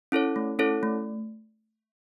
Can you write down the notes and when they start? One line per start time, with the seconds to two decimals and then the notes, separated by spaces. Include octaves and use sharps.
0.12 C#4 E4 A4 C#5
0.36 A3
0.59 C#4 E4 A4 C#5
0.83 A3